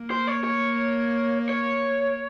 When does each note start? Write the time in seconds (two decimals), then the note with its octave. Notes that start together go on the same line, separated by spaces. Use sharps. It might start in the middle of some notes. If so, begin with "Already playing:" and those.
Already playing: A#3
0.11 C5
0.28 C#5
0.44 C#5
1.49 C#5